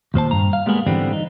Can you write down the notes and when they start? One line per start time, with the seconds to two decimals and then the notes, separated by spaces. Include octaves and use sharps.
0.14 D#2 A#2 C5 A5
0.31 G2 A#5
0.53 F5
0.66 G3 G#3 A#3 B3 G#4
0.87 G#2 D3 E3 G3 B3 C4
1.13 D#4